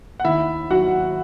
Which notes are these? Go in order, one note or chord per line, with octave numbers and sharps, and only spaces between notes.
F#5
D#2 E4 E5
D#3 F#3 F#4 F#5